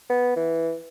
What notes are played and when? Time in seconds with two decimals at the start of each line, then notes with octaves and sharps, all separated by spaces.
0.10 B3
0.36 E3